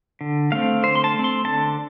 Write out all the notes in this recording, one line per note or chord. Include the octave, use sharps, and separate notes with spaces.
D3
A3 C4 F5
D3 C5
C6
A5
A3
C4
C6
D3 A5